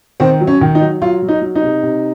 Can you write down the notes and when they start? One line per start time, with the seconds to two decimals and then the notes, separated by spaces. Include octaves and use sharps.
0.20 D#3 C4
0.41 F#3
0.47 C#4
0.61 D#3
0.75 D#4
0.81 F#3
1.02 F#3 F4
1.22 F#3
1.28 D#4
1.42 F#3
1.55 D#4
1.62 C3
1.83 C3